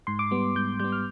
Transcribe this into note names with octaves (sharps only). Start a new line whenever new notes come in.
G#2 C6
D6
G3 B3
G#2 G6
G3 B3 G6
F6